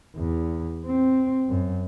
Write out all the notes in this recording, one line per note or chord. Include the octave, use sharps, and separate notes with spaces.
E2
C4
F#2